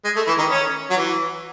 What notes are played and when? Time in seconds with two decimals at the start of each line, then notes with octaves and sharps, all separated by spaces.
0.05 G#3
0.16 A3
0.27 E3 E4
0.38 D#3 D#4
0.50 C#4
0.90 F#3
0.97 E3